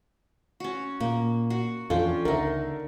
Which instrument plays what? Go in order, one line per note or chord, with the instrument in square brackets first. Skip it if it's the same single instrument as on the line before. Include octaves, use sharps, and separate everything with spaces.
[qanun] C#4 F#4
[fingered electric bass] A#2 [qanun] A#3
[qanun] F#4
[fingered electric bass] F2 E3 [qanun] C#4 D4 G5 [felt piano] F4 A4
[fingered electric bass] C#2 [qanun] D3 D#4 [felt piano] A#4 E5